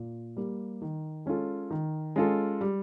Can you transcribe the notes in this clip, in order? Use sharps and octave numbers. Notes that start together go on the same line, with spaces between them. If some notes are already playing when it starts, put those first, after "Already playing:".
Already playing: A#2
G3 A#3
D#3
G#3 C#4 F4 A4
D#3
G#3 C#4 F4 A4
G3